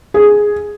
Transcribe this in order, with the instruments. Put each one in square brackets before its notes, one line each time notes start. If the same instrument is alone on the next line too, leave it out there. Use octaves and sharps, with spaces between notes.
[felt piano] G#4